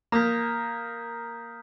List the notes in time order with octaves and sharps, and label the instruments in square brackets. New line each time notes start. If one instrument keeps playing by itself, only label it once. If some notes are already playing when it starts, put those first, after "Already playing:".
[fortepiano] A#3 [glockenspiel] A#5 D#6 G6 B6